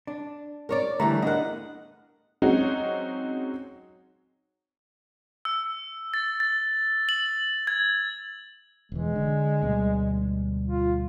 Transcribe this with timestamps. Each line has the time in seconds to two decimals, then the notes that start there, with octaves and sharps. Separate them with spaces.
0.07 D4
0.69 A#4 C#5 D5
1.00 D3 E3 G3 A3 A#5
1.22 B3 D4 A#4 D#5 F#5
2.42 F#3 G#3 C4 C#4 D#4 F#4
5.45 E6
6.14 A6
6.40 A6
7.09 F#7
7.67 G#6
8.92 E1 E3 G#3
9.16 D3
9.63 D2 B2 G3
10.68 F4